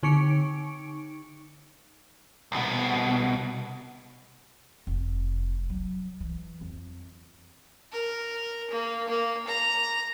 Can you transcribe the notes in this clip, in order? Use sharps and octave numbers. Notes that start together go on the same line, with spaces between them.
D3 D#4 C#6 C#7 D7
C2 B2
F1
F#3
E3
F2
A#4
A#3
A#3
A#5